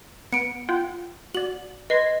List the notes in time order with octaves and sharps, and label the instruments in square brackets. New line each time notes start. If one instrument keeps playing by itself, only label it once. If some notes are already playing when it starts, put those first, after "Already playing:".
[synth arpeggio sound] B3 [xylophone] C#7 D7
[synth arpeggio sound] F4 F#5 G5
[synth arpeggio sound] F#4 D5 [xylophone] F#7
[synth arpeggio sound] B4 C6 G#6 [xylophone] D#5